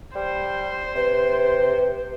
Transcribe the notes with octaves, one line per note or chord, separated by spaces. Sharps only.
G3 C5
C3 B4